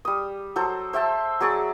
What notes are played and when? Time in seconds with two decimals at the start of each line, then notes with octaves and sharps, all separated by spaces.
0.05 G3 D#6
0.56 F#3 A4 C5 A#5
0.93 C5 E5 G5 A5
1.40 F#3 G#4 D5 C#6